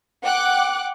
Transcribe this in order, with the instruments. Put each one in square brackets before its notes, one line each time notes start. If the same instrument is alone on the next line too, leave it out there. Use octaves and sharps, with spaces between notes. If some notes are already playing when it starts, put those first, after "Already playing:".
[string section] F#5 G5 D6 F#6